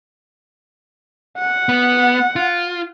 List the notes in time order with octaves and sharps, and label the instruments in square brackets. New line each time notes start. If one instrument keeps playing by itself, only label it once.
[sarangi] F#5
[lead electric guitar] B3
F4